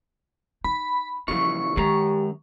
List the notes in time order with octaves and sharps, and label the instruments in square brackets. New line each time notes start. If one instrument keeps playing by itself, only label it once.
[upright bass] D#4 [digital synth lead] B5
[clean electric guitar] A#2 C#3 E3 [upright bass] F3 G3 [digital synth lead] C#6
[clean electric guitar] F#2 A4 A#5 [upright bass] D#3 G#3 [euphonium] G4